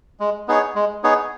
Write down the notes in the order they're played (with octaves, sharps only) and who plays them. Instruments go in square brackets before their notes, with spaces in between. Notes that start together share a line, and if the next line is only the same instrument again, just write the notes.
[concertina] G#3
B3 D#4 G#4 C#5
G#3
B3 D#4 G#4 C#5